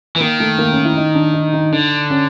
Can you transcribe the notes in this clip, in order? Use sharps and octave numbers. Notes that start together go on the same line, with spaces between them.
E3
D#3 A#3
A3
A#3
C#4
E4
D#4
D4
D#4
D#4
D3 D4
C#4